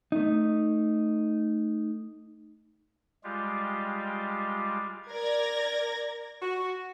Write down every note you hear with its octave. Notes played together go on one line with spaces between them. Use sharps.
A3 D#4
G3 G#3 F4 G4
A#4 D5 G#6 A#6
F#4